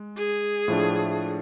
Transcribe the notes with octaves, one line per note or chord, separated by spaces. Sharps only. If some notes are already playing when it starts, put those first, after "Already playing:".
Already playing: G#3
G#4
A2 F3 A3 D4